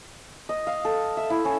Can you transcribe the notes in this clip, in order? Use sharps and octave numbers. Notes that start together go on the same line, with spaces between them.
D#5
F5
A4
E5
E4
C#4